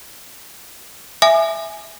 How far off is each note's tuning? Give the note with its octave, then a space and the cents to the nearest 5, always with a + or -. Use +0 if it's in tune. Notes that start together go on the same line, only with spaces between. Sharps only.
E5 +0 G#5 +0 D6 +45